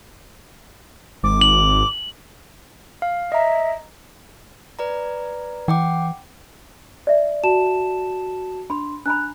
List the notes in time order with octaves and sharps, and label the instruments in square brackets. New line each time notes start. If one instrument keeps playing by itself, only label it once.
[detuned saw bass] G#1 [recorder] D6
[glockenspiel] F#7
[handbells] F5
[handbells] D#5 A#5 [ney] E5
[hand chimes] B4 D5 A#5
[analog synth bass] E3 [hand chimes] F#5 G5 D6
[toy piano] D5 E5
[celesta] F#4 A5 E7
[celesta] D4 C6 [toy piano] B5
[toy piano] D4 A#5 B5 [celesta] F#6